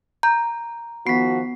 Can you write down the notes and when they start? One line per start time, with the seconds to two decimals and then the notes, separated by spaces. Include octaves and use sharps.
0.23 A#5 G6
1.07 D#3 F3 B3 F#4 B6 C7